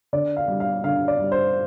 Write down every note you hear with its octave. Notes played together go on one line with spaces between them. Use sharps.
D3 D5
F5
G3
F5
D3 F5
D5
G3
C5